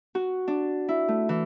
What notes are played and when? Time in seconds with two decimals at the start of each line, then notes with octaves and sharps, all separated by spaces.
0.15 F#4
0.48 D4
0.89 E4
1.08 A3
1.29 E3